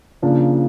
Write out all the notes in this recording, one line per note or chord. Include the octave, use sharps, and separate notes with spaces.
C#3 F3 A#3 D4